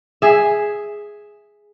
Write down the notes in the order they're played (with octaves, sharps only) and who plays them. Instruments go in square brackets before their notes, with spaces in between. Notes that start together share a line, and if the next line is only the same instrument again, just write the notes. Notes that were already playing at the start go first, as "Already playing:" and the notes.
[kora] G#4 E5